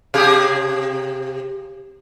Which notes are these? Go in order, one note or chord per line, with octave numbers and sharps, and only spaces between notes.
C3 G4 G#4